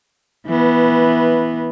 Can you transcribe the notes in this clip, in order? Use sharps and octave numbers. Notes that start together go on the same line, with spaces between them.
E3 B3